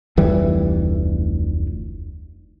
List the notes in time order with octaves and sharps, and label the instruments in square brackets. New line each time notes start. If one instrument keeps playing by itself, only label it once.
[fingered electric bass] F1 D2 E3 G3